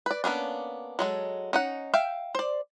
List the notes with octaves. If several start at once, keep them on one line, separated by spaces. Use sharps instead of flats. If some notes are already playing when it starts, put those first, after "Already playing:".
B4 D5
A#3 B3 C#4 D4
F#3 G#3 A4
C#4 D#4 F#5
E5 F5 G5
C5 D5